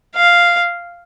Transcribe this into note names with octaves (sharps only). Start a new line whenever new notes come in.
F5